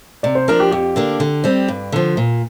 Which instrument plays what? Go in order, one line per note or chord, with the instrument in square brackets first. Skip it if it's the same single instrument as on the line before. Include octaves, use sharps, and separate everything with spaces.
[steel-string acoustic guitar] C3 [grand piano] D5
[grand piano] C5
[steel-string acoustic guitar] F3 D4 [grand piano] A#4
[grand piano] G4
[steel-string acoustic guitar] F2 [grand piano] G4
[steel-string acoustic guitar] D3 A#3 D4
D3
G3 C4
G2
D3 F3
A#2